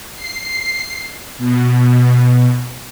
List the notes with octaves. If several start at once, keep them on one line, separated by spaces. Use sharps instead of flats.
C7
B2